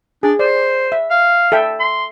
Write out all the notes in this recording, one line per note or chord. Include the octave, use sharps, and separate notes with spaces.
D4 G#4
C5 D5
E5
F5
A4 E5 G5
C6